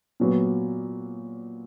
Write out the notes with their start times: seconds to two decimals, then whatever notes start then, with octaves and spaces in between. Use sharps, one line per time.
0.20 A#2 F#3 B3